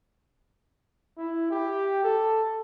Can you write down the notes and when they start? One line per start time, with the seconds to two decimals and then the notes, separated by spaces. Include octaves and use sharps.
1.18 E4
1.51 G4
2.03 A4